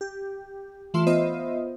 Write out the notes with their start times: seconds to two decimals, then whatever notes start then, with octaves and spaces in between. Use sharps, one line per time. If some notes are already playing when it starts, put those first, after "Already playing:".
0.01 G4
0.94 E3 A3 F4 E5 C6 E7
1.07 B3 F4 C5 D#5 E5